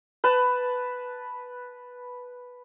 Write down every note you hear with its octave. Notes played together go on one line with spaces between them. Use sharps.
B4 A5